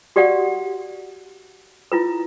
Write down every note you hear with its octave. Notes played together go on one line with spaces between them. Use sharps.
F#4 G4 D5 F5 F#5
E4 F4 B4